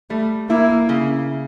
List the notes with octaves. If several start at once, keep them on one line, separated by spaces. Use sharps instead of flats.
G3 A3
A#3 E4
C#3